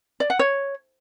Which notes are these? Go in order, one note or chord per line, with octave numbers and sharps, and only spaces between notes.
D5
F#5
C#5